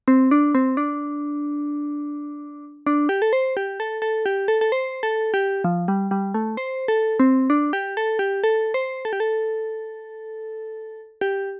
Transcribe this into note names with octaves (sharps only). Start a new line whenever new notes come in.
C4
D4
C4
D4
D4
G4
A4
C5
G4
A4
A4
G4
A4
A4
C5
A4
G4
F3
G3
G3
A3
C5
A4
C4
D4
G4
A4
G4
A4
C5
A4
G4
A4
G4